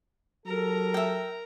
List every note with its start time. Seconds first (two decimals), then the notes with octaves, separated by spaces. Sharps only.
0.46 F#3 G4 A4 A#4 A#5
0.94 E5 G5